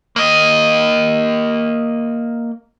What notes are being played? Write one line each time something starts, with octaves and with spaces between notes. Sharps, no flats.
A#3 D#5